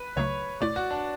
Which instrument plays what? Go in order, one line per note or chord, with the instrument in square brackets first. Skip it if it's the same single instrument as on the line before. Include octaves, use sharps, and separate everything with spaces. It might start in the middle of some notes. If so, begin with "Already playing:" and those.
Already playing: [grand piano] B4
[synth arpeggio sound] C#2 C#3 F#3 A3 [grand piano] C#5
[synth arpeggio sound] B2 A3 E4 [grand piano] D5
[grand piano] F#4
D4